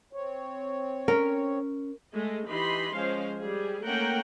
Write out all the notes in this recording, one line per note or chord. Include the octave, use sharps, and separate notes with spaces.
C4 C#5
C#4 A#4
G#3 A3 D#5
E3 D#4 G4 D#5 B5 C6
F3 G#3 C#4 C5 F5
G3 G#4
A3 A#3 C#4 A#4 F#5 G5